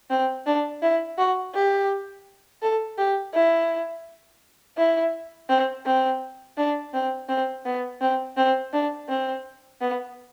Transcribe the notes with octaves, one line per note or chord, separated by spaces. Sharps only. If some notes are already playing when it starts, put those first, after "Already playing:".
C4
D4
E4
F#4
G4
A4
G4
E4
E4
C4
C4
D4
C4
C4
B3
C4
C4
D4
C4
B3